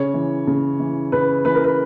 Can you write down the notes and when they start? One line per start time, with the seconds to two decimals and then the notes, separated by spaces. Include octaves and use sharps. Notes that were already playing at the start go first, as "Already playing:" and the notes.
Already playing: C#3 C#5
0.14 E3
0.47 C#3
0.80 E3
1.12 C#3 B4
1.45 E3 B4
1.55 A#4
1.64 B4